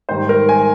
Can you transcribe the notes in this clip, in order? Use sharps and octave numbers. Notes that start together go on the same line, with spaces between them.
G#2 D#3 G3 C5
A#4
G#5